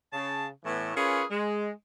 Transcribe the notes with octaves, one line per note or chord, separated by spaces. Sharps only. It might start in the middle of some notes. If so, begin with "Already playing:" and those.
C#3 A5
A2 E3 A3 B3
C#4 F4 G#4 A#4 B4 C#5
G#3